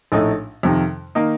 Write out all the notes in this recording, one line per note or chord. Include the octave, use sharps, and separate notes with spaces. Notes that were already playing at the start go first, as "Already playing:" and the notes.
A#1 A2 A3 D#4
F2 C3 D#3
D#3 A#3 D#4